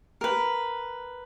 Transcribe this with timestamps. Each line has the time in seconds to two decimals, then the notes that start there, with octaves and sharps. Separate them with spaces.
0.21 A#4 B4